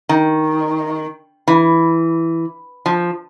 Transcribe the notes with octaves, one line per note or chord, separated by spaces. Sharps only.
D#3
E3
F3